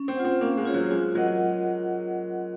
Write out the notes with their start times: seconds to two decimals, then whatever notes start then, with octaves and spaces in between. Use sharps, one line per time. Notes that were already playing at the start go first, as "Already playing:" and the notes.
Already playing: C#4
0.08 C4
0.16 F4 C5 F#5
0.25 C4
0.41 A#3 C#4
0.57 G#3
0.65 F4 G#4 C#5
0.74 F#3
0.91 G#3 F4
1.15 F#3 A#4 D#5 F#5